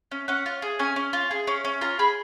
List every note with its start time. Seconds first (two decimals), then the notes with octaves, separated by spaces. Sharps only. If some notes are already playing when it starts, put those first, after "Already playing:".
0.11 C#4
0.28 C#4 F#5
0.46 F4
0.62 G#4
0.79 C#4 G#5
0.96 C#4
1.13 F4
1.31 G#4
1.47 C#4
1.65 C#4
1.81 F4 A#5
1.99 G#4 B5